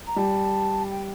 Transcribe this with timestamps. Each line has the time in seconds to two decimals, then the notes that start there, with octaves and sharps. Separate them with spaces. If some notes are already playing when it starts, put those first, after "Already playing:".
0.06 A#5
0.16 G3 A5
0.90 G5